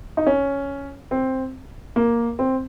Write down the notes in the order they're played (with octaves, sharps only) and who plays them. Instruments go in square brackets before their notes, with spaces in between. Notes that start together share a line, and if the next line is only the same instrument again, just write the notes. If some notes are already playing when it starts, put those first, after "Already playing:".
[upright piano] D#4
C#4
C4
A#3
C4